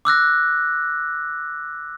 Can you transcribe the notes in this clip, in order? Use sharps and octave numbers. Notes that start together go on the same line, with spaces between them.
D6 E6 F#6 A#6